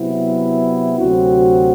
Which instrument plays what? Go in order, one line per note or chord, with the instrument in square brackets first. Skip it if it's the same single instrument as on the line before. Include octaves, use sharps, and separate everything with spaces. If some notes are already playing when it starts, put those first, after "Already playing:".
Already playing: [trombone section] C3 F#3 B3 E4
D2 C3 F#3 C4 F#4